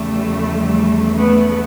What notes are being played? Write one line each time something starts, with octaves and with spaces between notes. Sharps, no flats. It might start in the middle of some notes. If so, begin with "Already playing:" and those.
Already playing: E2 C#3 F3 G3 A3
A3 B3